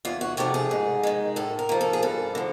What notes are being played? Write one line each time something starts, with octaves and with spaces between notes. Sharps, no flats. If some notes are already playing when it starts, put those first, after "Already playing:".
E2 F4
F#4
C3 F3 A3 G4
G#4
G#2
D#3 G#3
A2 A4
A#4
F3 A#3
A4
G#4
G2 A4
D3 F3